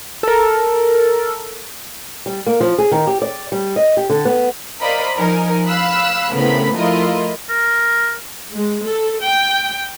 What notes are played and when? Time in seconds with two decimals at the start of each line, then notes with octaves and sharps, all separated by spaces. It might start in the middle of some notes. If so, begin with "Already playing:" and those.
0.23 A4 A#4
2.26 G3
2.47 A#3
2.61 F3
2.78 G#4
2.92 D#3
3.07 G4
3.22 D5
3.52 G3
3.76 D#5
3.97 G4
4.10 D3
4.25 B3
4.81 A#4 C5 D5 D#5 F5 B5
5.18 F3 D#4 A#4 G#5
5.67 F5 B5 E6 F#6
6.33 A2 C#3 B3 C4 A#4 B5
6.75 F3 A3 E4 F4 A#4 D#5
7.49 A#4
8.54 G#3
8.84 A4
9.23 G5